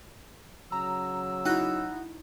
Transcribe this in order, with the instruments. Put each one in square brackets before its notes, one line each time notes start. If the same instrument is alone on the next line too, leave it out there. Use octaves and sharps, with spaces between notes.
[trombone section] C#3 F#3 [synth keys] A#5 [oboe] E6
[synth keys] D#4 E4 [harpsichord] F#4